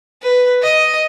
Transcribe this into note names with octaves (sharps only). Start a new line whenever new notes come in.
B4
D#5